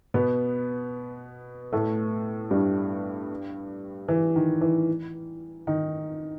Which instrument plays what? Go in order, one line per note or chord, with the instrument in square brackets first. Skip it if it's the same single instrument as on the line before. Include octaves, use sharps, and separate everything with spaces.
[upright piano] B2 B3
A2 A3
G2 G3
E3
D#3
E3
D#3 D#4